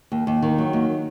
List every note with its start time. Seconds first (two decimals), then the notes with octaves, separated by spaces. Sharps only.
0.12 D#2
0.27 D#2
0.42 D#3
0.58 F#3
0.73 D#2